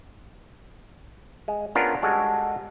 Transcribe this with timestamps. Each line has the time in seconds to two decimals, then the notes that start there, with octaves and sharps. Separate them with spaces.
1.48 G#3
1.75 B3 C#4 D4 F4 A#4
2.02 G3 G#3 F#4 A4